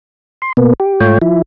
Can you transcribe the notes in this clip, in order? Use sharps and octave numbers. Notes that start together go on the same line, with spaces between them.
C6
B2 A#3 B3
G4
G#2 A3 F4 C#5 G5
F3 E4